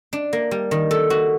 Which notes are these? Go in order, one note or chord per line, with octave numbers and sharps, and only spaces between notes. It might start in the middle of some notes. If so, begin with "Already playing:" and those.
D4
A#3
G3
D#3
A4
F#4